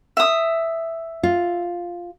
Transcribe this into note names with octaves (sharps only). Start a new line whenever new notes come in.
E5 D#6
F4